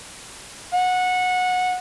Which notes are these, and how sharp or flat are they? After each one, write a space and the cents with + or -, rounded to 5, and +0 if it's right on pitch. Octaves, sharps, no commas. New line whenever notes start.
F#5 -20